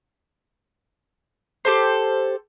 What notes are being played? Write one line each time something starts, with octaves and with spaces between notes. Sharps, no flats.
G4 A4 C5